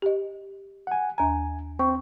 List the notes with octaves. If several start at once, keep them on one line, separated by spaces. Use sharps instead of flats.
G4 D#5
F#5 G#5
D#2 G#5 A#5
C4 C#6